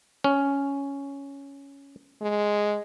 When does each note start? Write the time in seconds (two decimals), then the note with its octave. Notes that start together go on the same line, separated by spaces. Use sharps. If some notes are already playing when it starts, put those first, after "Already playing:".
0.24 C#4
2.22 G#3